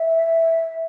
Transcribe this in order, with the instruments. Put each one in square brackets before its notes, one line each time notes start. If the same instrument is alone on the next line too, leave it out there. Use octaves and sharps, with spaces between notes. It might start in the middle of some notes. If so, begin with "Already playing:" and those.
Already playing: [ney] E5